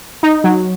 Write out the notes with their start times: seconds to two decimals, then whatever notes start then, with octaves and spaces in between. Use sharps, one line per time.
0.23 D#4
0.44 F#3